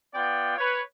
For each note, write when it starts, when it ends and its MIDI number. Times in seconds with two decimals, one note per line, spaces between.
0.14 0.56 59
0.14 0.56 65
0.14 0.56 74
0.14 0.56 79
0.58 0.80 71
0.58 0.80 73